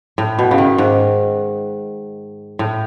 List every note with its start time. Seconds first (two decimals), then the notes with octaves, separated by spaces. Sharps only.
0.18 A2
0.39 B2
0.51 C#3
0.58 D#3
0.78 G#2
2.59 A2